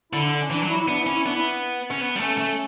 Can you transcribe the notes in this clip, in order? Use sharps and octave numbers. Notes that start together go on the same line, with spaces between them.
D3 E4
D4
C#4
E3 D4
F#3
E4
E4
B3 D4
E4
C#4
E4
B3 D4
E4
C#4
B3
G3
A3 C#4
A3